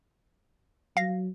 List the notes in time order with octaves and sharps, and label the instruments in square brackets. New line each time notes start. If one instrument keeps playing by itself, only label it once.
[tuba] F#3 [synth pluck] F5 A#6